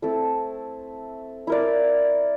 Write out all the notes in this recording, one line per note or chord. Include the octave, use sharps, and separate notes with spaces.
A3 C4 E4 A4
E4 A#4 D5